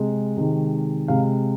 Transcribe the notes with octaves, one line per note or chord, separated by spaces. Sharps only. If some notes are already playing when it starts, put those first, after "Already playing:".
Already playing: C3 G#3
C3 D#3 G#3
C3 G#3 F5